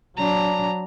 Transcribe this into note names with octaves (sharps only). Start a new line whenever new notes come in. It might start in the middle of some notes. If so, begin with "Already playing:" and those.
F#3 D4 A#5